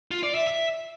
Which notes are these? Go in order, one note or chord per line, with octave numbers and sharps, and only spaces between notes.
F4
D5
E5
E5